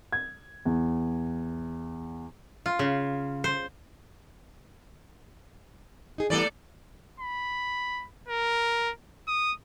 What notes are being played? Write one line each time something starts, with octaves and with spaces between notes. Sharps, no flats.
G#6
E2
F4
C#3
C5
D#4 G#4
E3 G3 A3 B3 A4 D5
B5
A#4
D#6